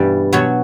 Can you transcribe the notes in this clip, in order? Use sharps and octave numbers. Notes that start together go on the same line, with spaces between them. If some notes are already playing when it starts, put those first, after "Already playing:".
Already playing: G2 B2 E3 G3 D5
B2 F#3 C#5